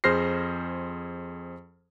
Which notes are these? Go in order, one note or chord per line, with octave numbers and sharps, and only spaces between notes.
F2 G#4 C5 F6 A#6 C7